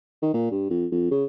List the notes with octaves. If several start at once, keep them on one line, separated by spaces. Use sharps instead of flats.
D#3
A#2
G2
F2
F2
C#3